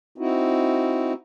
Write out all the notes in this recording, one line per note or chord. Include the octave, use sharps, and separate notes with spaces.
C4 D#4 E4 F#4